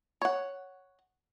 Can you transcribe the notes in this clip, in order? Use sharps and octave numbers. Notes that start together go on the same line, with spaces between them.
C#5 F#5